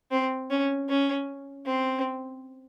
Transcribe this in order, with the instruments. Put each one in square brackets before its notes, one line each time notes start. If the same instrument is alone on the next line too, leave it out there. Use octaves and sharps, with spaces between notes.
[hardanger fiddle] C4
C#4
C#4
C4